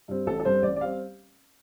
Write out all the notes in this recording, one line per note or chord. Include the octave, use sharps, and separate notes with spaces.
G2 G3 C4
A1 A4
A4
G2 G3 C4 C5
A1 D5
D5
G3 C4 F5